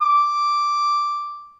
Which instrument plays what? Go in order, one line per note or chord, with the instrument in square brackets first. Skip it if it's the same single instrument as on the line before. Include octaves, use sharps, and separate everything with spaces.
[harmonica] D6